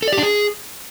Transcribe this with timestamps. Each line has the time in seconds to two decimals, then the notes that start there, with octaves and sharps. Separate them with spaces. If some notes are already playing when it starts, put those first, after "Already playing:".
0.02 A4
0.07 D5
0.13 G4
0.18 D4
0.23 G#4